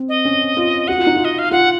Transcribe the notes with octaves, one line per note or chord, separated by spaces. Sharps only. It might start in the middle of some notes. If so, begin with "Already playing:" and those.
Already playing: C4
D#5
C#4
F4
F#4 F#5
F4
D#4
F4
D#5
F5
F4 F#5